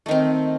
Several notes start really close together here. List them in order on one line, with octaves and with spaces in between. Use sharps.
A3 D#3 C4